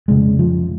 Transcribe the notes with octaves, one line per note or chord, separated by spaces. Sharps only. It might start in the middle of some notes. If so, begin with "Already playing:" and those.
F2 C#3 G#3
F3